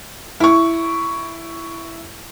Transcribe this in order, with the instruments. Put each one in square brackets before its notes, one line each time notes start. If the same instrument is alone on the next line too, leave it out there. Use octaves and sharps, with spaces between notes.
[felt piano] E4 C#6